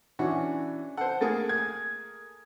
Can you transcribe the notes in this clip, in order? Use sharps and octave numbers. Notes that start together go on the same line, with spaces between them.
E3 C#4 D4 F#4
A4 C5 F#5
A3 A#3 G#4 A6
G#6